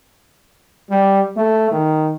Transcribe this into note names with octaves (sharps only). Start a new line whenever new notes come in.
G3
A3
D#3